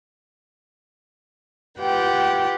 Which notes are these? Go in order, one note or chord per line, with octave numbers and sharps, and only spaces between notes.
F4 G4 B4 F#5 G5